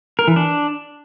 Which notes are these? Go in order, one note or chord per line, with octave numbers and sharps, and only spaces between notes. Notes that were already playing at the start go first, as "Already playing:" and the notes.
A#4
E3
D4